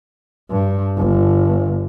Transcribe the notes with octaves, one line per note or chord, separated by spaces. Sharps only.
G2
G1